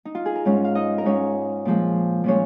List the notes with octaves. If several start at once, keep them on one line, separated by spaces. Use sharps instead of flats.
D#4
F4
G#4
A#4
G#2 G#3 C#4 C#5
F5
D#4 D#5
A#4
G#2 G#3 C#4 C#5
A#2 F3 G#3
A#2 F3 G#3 C#4 C#5